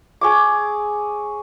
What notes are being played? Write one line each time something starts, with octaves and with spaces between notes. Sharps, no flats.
G#4 C#5 D6